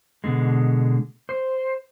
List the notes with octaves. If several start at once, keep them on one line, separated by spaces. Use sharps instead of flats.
B2 D3 G#3
C5